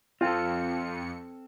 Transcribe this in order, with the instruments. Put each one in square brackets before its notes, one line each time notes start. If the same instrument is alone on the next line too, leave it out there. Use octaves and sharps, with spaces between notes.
[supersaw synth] F2 C#7 [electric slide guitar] C4 A4 [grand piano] F4 G5